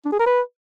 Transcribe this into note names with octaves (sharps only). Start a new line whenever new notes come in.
D4
G#4
A#4
B4